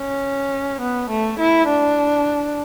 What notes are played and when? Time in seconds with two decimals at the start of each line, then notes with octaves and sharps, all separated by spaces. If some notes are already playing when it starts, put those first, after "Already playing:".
Already playing: C#4
0.81 B3
1.10 A3
1.40 E4
1.69 D4